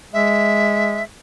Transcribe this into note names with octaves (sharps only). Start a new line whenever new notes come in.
G#3 E5